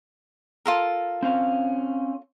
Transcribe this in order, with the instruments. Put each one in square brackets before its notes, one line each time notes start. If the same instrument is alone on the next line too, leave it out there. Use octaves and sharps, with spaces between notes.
[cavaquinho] F4 A4 A#4
[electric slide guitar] C4 C#4 F5